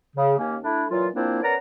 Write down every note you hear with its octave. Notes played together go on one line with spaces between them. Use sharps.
C#3
D#2 A#3 C#4
A3 D4 E4
A#2 E3 F#3 F4
A#2 F3 A#3 C4 D4 E4
B3 C#4 A#4 D5 F#5 A#5